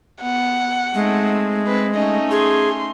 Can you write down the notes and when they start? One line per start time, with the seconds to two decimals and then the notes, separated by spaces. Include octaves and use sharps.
0.21 B3 F#5
0.94 G#3 A3 C4 D#4
1.67 C4 B4
1.95 A3 C#4 D#4 D#5
2.31 G#4 C6